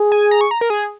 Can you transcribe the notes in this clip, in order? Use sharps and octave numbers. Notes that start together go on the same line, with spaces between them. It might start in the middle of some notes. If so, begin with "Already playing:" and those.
Already playing: G#4
G#5
A#5
C#6
A#5
A#4
G#4